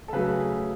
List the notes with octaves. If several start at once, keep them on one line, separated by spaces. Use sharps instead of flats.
A4
C#3 F#3 A3 G#4 B4